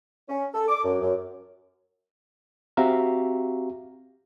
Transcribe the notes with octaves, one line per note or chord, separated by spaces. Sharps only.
C#4
A4
D6
F#2
F#2
C4 F#4 G4 E5 F5 A#5